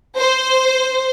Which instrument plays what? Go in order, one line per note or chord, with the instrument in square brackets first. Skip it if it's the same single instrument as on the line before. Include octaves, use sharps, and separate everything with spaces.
[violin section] C5